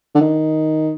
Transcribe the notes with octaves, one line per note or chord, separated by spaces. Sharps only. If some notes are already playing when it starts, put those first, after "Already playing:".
D3
D#3